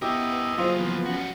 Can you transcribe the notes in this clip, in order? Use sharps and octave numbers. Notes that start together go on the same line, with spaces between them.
B3 E4 G4 A#4 D#5 E5
F#3 A#3 F4 G#4 C5
E3 F3 B3
G3 C#4 F#4